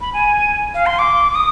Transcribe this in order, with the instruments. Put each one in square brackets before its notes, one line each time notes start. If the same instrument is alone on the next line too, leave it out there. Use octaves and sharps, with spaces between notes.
[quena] B5
G#5
F5
C6
D6
D#6